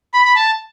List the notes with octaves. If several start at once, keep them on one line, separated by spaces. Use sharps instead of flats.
B5
B5
A5